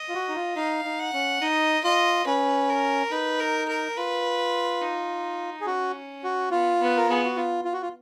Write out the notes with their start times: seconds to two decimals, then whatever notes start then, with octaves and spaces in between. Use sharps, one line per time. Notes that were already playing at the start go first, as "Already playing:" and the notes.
Already playing: D#5
0.09 F4
0.14 F#4
0.29 D#4
0.35 F4
0.56 D#4 F5
0.85 D#4
0.99 F#5
1.13 C#4
1.41 D#4 D#5
1.84 F4 D#5
2.26 C#4 B4
2.69 A#4
3.11 D#4 B4
3.40 A#4
3.68 A#4
3.97 F4 B4
4.81 D#4
5.61 G#4
5.66 C#4 F#4
6.24 F#4
6.51 B3 F4
6.80 B3 B4
6.97 A#4
7.08 B3 G#4
7.24 F#4
7.37 F4
7.65 F4
7.73 F#4
7.82 F4